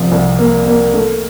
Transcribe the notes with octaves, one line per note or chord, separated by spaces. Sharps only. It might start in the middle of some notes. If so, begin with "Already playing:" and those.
Already playing: C2 C3 F3
C2
A#3
A#3
A3